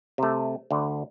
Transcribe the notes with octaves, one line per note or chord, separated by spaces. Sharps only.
C3 A3
D2 D3